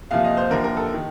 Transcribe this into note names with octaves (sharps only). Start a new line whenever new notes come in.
C2 A#2 F3 F5
D#5
C5
D#2 D3 F3 A#4
A#4
A4
D#3